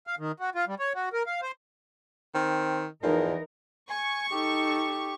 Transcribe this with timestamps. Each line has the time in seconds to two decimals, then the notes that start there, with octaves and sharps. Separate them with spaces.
0.07 F5
0.19 D#3
0.40 F#4
0.55 F4
0.67 G3
0.79 C#5
0.95 F#4
1.13 A#4
1.27 F5
1.42 C5
2.35 D#3 C4
3.03 E2 E3 F3 D#4 A#4
3.90 G#5 C#6
4.31 D#4 G4 A4